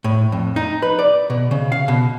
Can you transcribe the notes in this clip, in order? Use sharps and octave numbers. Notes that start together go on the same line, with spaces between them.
A2
F2
D#4
B4
D5
B2
C#3
F5
B2